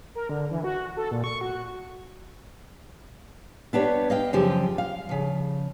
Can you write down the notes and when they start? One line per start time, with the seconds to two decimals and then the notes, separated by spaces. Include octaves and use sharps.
0.15 A#4
0.29 D3
0.51 E3
0.64 F#4
0.97 A4
1.11 A#2
1.24 C#6
1.41 F#4
3.73 B3 D4 G4 C#5
4.10 D#5 F5 G5
4.33 F#2 C#3 F3 G4
4.78 F5
5.09 C#3 F3